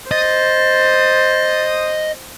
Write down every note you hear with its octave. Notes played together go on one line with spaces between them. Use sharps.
C5 D#5 A6